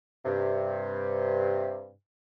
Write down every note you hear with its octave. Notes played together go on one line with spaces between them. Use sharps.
G2 C3